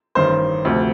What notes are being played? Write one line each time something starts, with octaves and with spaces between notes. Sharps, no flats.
A1 G2 D#3 C5
D2 C3 F3 A3